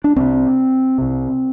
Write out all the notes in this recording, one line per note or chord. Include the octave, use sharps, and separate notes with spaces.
D4
C2 C3 C4
C2 C3